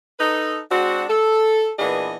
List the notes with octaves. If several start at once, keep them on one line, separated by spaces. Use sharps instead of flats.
D#4 A4 B4
G#3 C4 D4 F#4
A4
A#2 E3 B3 D4 G#4 D#5